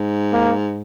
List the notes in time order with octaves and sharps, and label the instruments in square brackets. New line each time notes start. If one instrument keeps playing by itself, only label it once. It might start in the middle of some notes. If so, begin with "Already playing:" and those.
Already playing: [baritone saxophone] G#2
[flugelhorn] A#3